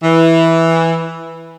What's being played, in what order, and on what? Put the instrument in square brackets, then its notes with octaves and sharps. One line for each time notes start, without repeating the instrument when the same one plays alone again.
[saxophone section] E3